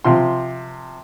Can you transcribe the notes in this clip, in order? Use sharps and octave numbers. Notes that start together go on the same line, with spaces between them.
C3 F3 C6